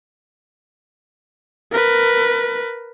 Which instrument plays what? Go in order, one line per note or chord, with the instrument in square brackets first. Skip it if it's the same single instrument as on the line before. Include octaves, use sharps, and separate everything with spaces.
[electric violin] A#4 B4